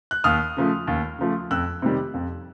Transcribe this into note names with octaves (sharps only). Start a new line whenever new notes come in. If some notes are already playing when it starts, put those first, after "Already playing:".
F#6
D#2 D#6 F6
C#3 F3 A3
D#2
C#3 F3 A3
F2 E6 F#6
C3 D#3 G3
F2